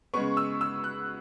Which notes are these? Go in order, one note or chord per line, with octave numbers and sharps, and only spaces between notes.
C#3 G#3 B3 C#6
E6
E6
F#6